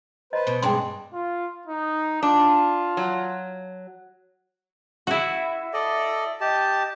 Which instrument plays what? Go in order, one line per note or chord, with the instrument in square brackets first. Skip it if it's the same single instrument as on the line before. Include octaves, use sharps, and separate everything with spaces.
[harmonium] B4 C5 [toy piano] D#5
[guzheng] B2
[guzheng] G2 D4 [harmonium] G#3 [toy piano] G5 C6
[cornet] F4
D#4
[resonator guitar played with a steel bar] D4 [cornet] F4
[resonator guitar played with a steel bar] F#3
[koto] E4 F#4 [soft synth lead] E5
[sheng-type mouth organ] A4 D5 D#5
[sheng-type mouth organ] G4 A5 [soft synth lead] D#5